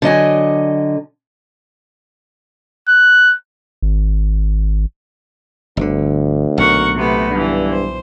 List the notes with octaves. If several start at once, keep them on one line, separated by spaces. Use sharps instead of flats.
D3 F#3 D#5 G#5
F#6
G#1
G1 D2 D3
B1 A#2 A#4 F#5 C#6
C3 A3 B3
G2 D3 E3
C5